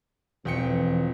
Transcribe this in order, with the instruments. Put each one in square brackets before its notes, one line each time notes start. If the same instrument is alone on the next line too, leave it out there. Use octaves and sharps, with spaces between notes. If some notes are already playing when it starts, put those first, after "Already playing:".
[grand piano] E1 G5 C#7 [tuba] F2 [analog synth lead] E3